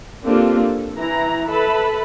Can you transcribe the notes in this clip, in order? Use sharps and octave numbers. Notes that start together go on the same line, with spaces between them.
A#3 C4 D4 F4 G4 A4
A4
E3 E4 A#5
A4 B4 E5 A5 B5